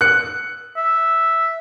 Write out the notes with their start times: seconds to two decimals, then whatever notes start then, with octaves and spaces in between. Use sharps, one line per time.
0.01 F#6 C#7
0.77 E5